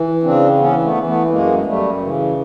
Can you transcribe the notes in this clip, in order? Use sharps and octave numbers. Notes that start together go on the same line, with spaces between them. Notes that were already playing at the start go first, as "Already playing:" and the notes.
Already playing: E3
C#3 C4 D4
E3 B3 C#4
A3 B3
E3
A3 B3
F#2 G#3 A#3
F#2 G3 A3
C#3 E3